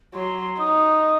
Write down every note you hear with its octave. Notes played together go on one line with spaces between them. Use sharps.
F#3 C6
D#4 D#6
D#6